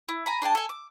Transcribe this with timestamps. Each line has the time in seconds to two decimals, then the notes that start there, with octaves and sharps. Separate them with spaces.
0.09 E4
0.26 G#5 A#5 B5
0.42 D4 G#4 G5 A5
0.55 A4 G#5
0.69 D6